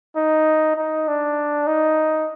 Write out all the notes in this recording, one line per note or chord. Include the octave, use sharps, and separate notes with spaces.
D#4
D#4
D4
D#4